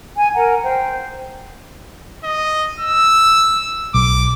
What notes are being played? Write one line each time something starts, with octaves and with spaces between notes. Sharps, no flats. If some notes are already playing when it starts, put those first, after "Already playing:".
G#5
A#4 F#5 G#5 A#5
C5 G5
D#5
E6
B1 D6